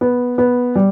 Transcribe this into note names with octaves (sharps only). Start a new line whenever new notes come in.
B3
B3
G3